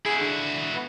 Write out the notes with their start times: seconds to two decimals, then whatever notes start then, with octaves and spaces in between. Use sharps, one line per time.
0.06 E4 F#4 G#4
0.20 D3
0.74 B3